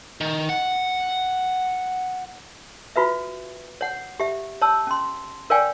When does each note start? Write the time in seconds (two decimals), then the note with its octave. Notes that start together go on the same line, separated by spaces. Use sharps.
0.21 D#3
0.49 F#5
2.96 F4 F#4 B4 E5
3.81 C#5 F#5
4.20 G4 E5
4.62 C#5 A5 E6
4.87 C#4 C6
5.50 A#4 C#5 D5 F5 G5 G#5